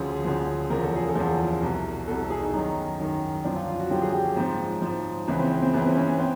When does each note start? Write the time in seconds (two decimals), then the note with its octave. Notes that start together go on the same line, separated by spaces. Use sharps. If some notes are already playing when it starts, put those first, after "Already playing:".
Already playing: D2 C#3 F3 G#4
0.25 D2 C#3 F3
0.70 E2 C#3 F3 A#4
0.83 A4
0.96 G#4
1.09 A4
1.15 E2 C#3 F3
1.62 C2 B2
2.07 B2 A4
2.11 C2
2.19 A4
2.30 G#4
2.42 D#4
2.53 F#2 D#3 D#4
2.99 F#2 D#3
3.44 F#2 D3 F3 D4
3.56 F4
3.68 F4
3.80 F#4
3.90 F#2 D3 F3 G4
4.02 G#4
4.13 G4
4.25 C#4
4.36 G#2 F3 C4
4.82 G#2 F3
5.28 C#2 C#3 E3 B3
5.39 C4
5.51 C4
5.62 C4
5.73 C#2 C#3 E3 B3
5.86 C4
5.96 C#4
6.09 B3
6.20 C4